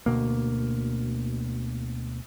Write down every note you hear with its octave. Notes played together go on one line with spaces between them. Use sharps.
D2 B2 A#3